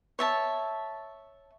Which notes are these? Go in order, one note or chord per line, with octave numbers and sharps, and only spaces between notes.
C#5 E5 A5